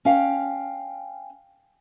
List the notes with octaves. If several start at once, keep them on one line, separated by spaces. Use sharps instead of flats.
C#4 F5 G5